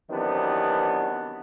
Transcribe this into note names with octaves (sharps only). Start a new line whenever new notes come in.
C3 D#3 E3 F#3 B3 D4